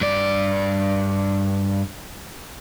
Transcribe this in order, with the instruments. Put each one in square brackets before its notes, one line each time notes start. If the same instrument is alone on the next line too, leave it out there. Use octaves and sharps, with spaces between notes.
[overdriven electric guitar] G2 D5